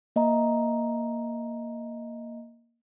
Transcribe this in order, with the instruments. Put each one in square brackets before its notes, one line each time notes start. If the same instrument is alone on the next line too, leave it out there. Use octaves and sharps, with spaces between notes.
[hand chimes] A#3 D#5 E5 A#5